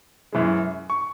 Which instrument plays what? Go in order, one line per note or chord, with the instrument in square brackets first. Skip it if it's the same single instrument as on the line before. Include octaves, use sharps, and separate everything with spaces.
[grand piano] F#2 E3 G#3
C#6